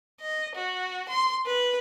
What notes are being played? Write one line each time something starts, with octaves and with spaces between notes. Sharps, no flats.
D#5
F#4
C6
B4